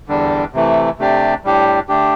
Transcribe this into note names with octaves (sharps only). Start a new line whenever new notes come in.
E2 D3 G3 D4
C3 E3 A3
C3 A3 D4 G4 D5
A2 G3 D4 G4
D3 A3 D4 G4